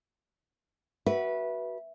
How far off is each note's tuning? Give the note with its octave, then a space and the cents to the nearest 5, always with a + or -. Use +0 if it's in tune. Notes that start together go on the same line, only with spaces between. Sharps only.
F#4 +20 B4 -20 E5 +0